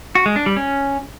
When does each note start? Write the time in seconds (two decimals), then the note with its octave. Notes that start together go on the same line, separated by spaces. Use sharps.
0.15 F#4
0.26 G#3
0.36 D4
0.46 G3
0.57 C#4